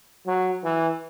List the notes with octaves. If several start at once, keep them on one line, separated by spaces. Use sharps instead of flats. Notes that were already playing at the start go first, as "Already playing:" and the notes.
F#3
E3